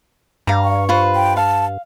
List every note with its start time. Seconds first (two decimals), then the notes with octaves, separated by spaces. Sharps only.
0.47 G2 F5 A#5
0.64 C#6
0.89 F4 B4 C5
1.15 G5
1.37 F5 A5